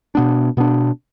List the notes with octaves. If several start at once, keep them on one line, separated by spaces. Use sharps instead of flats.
B2 B3 D4
B2 B3 D4